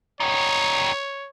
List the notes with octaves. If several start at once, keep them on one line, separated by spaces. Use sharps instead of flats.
G3 D#4 C#5